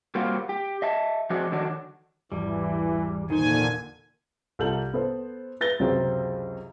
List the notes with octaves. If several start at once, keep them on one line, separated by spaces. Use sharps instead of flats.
G3 A#3 C4 F4 F#4
G4
D#5 E5 A5
F3 G#3 C4 D4 F#4
D3 D#3 F#3 D4 F#4
G#1 E2 E3 G3
A#2 D3 D#3 D#4 C5 G#5
C2 F4 A4 G6 F#7
B3 A4 C5
B4 A6 A#6 G7
C#2 F#2 C3 C4